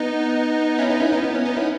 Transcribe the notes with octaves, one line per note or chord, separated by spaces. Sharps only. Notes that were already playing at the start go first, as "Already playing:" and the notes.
Already playing: B3 D#4
C#4 E4
B3 D#4
C#4 E4
B3 D#4
B3
C#4
B3 D#4
C#4 E4